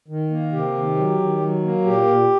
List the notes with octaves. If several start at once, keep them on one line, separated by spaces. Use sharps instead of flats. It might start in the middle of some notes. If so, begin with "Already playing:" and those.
D#3
A#3
C3 G4
D#3
F#3
D#3
F#3
A#3
A#2 G4
A#2